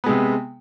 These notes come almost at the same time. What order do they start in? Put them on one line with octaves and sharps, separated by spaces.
B3 G#3 C3